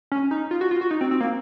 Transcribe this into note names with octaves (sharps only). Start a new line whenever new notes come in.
C#4
D#4
F4
F#4
F4
F#4
D#4
C4
C4
A#3